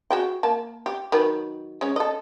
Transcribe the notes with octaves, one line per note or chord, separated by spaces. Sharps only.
F#4 G#4 G5
A#3 A5
G4
D#3 F#3 B4
G#3 C#4
A4 D#5